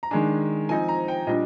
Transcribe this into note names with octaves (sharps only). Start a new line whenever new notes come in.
A#5
D#3 G#3 D4 G#5
F3 C4 D#4 G#5
A#5
G5
A#2 G3 D4 D#5